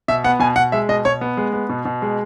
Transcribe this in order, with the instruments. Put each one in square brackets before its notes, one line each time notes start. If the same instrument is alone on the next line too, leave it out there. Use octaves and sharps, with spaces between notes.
[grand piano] B2 E5
B3 F#5
B2 G#5
B2 F#5
G#3 E5
B2 D#5
B2 C#5
B3
G#3
B3
B2
B2
G#3